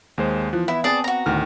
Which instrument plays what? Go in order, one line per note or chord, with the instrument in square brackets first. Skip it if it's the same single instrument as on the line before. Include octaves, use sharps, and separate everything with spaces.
[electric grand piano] D#2 G#3 C5
[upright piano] E3 F#6 [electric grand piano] F3
[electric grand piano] B3 [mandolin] E4
[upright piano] C4 [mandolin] G#4 D5 A5
[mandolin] F#4 A#5
[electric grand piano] D2 F6 [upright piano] A2 D#3